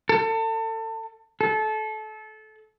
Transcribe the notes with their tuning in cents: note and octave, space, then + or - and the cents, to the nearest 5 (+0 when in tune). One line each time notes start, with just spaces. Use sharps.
A4 +30
A4 -25